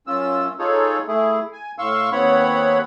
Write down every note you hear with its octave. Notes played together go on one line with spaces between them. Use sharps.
F#2 C#4 F4 E6
D#4 F4 G#4 A4 C#5
A3 E4 G#4
G#5
A2 F5 C6 C#6 E6
D#2 B3 C4 C#5 F#5 B5